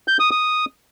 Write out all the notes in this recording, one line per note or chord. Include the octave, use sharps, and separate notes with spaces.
G6
D#6
D#6